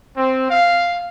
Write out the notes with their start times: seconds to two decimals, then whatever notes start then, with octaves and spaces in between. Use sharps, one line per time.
0.17 C4
0.50 F5